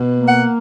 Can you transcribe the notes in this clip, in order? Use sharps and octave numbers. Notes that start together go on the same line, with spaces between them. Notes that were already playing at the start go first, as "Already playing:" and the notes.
Already playing: B2
A#3
F#5